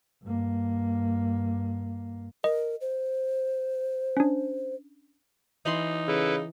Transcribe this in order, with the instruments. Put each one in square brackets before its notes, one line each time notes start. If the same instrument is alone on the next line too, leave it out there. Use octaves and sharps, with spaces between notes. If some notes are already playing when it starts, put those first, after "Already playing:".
[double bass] G2 A#3
[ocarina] A#4 [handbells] D#5
[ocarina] C5
[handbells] C#4 D4
[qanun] E3 B5 C6 [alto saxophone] D#4
[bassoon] C#3 [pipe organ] E4 A4 B4